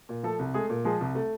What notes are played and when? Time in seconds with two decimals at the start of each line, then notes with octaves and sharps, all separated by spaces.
0.09 A#2
0.23 F3 A3 A4
0.39 C2
0.54 G#3 A3 G#4
0.70 A#2
0.85 F3 G#3 G#4
1.01 C2
1.15 A3